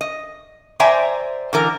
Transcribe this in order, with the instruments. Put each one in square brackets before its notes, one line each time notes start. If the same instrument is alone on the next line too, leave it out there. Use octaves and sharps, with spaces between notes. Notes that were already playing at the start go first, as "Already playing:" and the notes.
[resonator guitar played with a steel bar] D#5
C5 D5 E5 G5 G#5 A#5
D3 E3 A#4